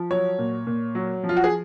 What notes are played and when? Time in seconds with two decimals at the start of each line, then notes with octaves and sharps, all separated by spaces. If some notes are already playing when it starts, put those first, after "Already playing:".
Already playing: F3
0.10 F#3 C#5
0.39 A#2
0.67 A#2
0.95 F#3
1.23 F3
1.29 F4
1.37 F#4
1.44 G#4